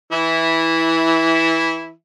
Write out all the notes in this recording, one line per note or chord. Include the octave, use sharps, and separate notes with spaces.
E3 E4